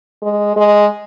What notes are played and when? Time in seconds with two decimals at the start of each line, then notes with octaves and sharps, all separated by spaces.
0.22 G#3
0.56 G#3